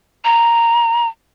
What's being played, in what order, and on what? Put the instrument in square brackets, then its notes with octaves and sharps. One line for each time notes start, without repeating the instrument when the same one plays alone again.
[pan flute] A#5